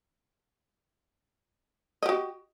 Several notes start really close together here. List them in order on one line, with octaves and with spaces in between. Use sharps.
D#5 G4 F#4